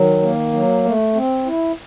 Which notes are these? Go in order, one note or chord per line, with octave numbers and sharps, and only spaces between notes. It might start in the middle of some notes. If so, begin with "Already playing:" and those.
Already playing: D#3 F#3
A#3
F#3
A3
C4
E4